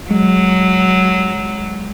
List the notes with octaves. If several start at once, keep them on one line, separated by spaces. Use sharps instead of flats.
F#3 G#3